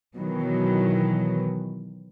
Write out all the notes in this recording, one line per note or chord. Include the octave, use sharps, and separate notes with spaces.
B2 D#3 E3 F#3